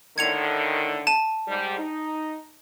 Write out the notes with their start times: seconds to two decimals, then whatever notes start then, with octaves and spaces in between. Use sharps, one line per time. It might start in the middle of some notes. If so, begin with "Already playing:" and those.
0.18 A2 D3 D#3 G#6 C#7 F7
1.07 A5 D#7
1.48 G#2 G3
1.79 D#4